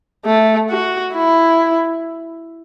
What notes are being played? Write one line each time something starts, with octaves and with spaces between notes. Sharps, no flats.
A3
F#4
E4